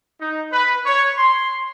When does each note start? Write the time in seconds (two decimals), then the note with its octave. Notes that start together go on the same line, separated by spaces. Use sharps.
0.20 D#4
0.52 B4
0.85 C#5
1.17 C6